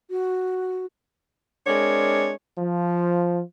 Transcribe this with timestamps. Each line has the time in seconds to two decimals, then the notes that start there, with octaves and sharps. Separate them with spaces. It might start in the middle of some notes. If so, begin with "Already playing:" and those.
0.10 F#4
1.67 G#3 C4 D4 A#4 C#5
2.58 F3